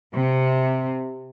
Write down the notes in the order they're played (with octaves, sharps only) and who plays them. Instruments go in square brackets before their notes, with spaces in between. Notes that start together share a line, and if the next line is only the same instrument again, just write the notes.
[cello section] C3